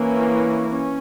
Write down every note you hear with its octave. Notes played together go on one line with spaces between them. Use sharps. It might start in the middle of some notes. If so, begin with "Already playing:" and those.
Already playing: E3 A#3 C#4
C#4